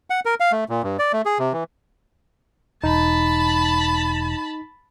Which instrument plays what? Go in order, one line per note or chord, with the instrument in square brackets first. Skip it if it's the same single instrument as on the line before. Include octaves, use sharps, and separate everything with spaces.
[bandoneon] F#5
A#4
F5
A3
A#2
G2
D5
A3
G#4
C3
E3
[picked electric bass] E1 [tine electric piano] D#4 [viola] A5 B5